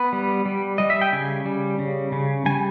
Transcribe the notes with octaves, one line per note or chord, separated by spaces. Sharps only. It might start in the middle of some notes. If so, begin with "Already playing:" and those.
Already playing: B3 B4
G3
G3
G3 D#5
E5
G5
C#3 G#5
G3
C#3
C#3
G3 G#5